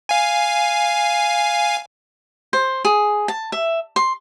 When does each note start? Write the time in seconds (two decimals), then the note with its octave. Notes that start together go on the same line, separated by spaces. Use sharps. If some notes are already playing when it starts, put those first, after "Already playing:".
0.09 F5 G#5
2.53 C5
2.85 G#4
3.28 A5
3.52 E5
3.96 C6